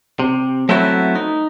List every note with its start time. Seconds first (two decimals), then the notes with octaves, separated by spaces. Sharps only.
0.20 C3
0.69 F#3 A3 B3 C4 E4 F#4
1.15 D#4